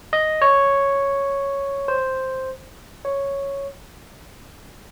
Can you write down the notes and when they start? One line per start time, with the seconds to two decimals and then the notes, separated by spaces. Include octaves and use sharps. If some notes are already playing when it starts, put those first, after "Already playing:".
0.13 D#5
0.42 C#5
1.88 C5
3.05 C#5